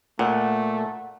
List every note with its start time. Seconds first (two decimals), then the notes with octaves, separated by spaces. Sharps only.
0.19 A#2 A3 F#5